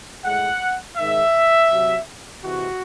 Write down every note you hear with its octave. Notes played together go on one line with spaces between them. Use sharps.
A2 G#3 F#5
G#2 D#3 G#3 E5
C3 F#3
C3 E3 G#3 F#4